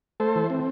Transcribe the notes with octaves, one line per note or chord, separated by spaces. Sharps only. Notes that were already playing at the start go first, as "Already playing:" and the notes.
A3 A4 C5
E3
C4